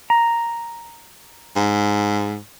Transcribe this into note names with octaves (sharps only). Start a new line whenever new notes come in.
A#5
G#2